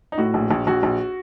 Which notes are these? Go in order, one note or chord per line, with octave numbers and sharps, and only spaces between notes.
D#4
A2 F#4
A#1
A#1
A#1 F#4
A#1